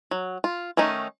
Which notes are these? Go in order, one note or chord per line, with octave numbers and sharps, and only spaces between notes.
F#3
F4
D#3 A3 C#4 D#4